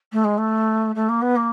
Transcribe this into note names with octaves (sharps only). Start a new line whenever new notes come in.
A3
G#3
A3
A3
A#3
B3
A#3